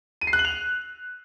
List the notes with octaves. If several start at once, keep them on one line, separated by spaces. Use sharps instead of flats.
D#7
C7
F#6
F#7
F7